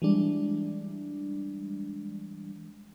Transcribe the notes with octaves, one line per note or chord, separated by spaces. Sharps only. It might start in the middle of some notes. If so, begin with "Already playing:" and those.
E3 G3 G#3 D4